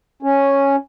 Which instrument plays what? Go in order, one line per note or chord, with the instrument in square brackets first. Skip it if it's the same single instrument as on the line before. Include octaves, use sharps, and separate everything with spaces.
[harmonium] C#4